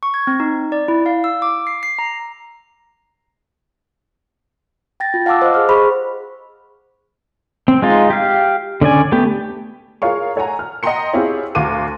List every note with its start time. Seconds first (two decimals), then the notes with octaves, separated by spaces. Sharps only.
0.03 C#6
0.14 G#6
0.27 C4
0.40 D#4
0.72 D5
0.88 E4
1.06 F5
1.24 E6
1.42 D6
1.67 C7
1.83 C7
1.99 A#5
5.00 G5 A6 A#6
5.14 F4
5.26 F5 F#5 A5 D6 E6
5.42 C5 D#5
5.54 G#4 F6
5.69 G#4 C5 B5 C#6
7.68 C4
7.82 G#3 D#4 F4
8.10 G4 F5
8.81 D3 C#4 D5 G#5
9.12 A3 B3 G4
10.02 F4 G#4 A#4 C#5 F5 C#6
10.36 A4 C#5 F#5 G#5 A#5
10.59 F6
10.83 D#5 F#5 G5 A#5 C6 C#7
11.14 C4 E4 F4 G4 G#4 C#5
11.55 D2 F#4 F5 C6 D6 D#7